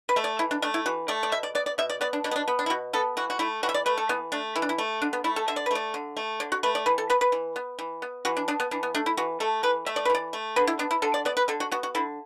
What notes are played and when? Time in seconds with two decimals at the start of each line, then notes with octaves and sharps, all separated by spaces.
0.09 B4
0.16 A3 E5
0.24 D5
0.39 E3 E4
0.51 D4
0.62 A3 D4
0.74 E4
0.86 E3 F#4
1.08 A3 D5
1.23 D5
1.32 B2 E5
1.43 D5
1.55 B3 D5
1.66 D5
1.78 B2 E5
1.90 D5
2.01 B3 D5
2.13 D4
2.24 B2 D4
2.31 B3
2.36 D4
2.48 B3
2.59 D4
2.66 E4
2.70 B2 F#4
2.93 B3 A4
3.17 E3 F#4
3.30 F#4
3.39 A3 E4
3.63 E3 F#4
3.69 E5
3.74 D5
3.86 A3 B4
3.98 A4
4.09 E3 B3
4.32 A3 D4
4.56 E3 E4
4.62 D4
4.69 E4
4.78 A3
5.02 D3 D4
5.13 B3
5.24 A3 E4
5.36 A4
5.48 D3 E5
5.56 D5
5.66 B4
5.71 A3 D5
5.94 D3
6.17 A3
6.40 D3 D5
6.52 F#4
6.63 A3 B4
6.75 D5
6.86 E3 B4
6.98 A4
7.10 B3 B4
7.21 B4
7.32 E3
7.56 B3
7.79 E3
8.02 B3
8.25 E3 F#4
8.37 D4
8.48 B3 D4
8.60 B3
8.71 E3 D4
8.83 B3
8.94 A3 D4
9.06 E4
9.17 E3 F#4
9.40 A3 A4
9.63 E3 B4
9.86 A3 E5
9.96 D5
10.05 B4
10.09 E3
10.15 D5
10.33 A3
10.56 D3 B4
10.67 E4
10.79 B3 D4
10.91 E4
11.02 D3 A4
11.14 D5
11.25 B3 D5
11.37 B4
11.48 D3 A4
11.60 F#4
11.72 B3 F#4
11.83 F#4
11.95 D3 E4